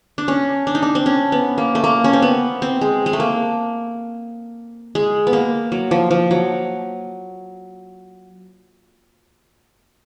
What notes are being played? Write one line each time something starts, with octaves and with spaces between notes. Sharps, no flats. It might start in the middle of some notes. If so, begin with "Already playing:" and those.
D4
C#4
D4
D#4
D4
C4
C#4
B3
A#3
A3
A#3
C#4
C4
B3
C4
G#3
G#3
A3
A#3
G#3
B3
A#3
F#3
F3
F3
F#3